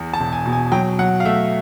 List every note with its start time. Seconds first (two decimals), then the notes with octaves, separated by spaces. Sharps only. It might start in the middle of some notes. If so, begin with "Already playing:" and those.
Already playing: E2
0.13 A5
0.20 E1
0.33 G#5
0.46 B2
0.53 G#5
0.72 F#3 G5
0.99 F#3 F#5
1.20 F5
1.25 A3 E5